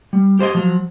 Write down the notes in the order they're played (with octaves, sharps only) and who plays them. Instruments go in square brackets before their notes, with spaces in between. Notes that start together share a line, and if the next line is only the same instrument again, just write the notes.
[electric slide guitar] G3
G4 C5 D5 D#5
F3 F#3